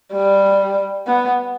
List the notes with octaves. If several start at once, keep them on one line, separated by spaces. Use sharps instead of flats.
G3
B3